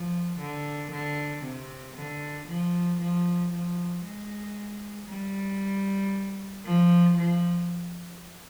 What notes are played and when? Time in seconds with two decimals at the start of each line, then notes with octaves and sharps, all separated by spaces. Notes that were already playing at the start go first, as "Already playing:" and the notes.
Already playing: F3
0.39 D3
0.91 D3
1.43 C3
1.97 D3
2.48 F3
3.00 F3
3.53 F3
4.04 G#3
5.08 G3
6.65 F3
7.17 F3